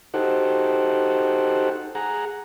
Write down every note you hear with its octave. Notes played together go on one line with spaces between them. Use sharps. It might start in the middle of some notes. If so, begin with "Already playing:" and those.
D#4 F#4 G4 A4 C5 F#5
G#4 F#5 A#5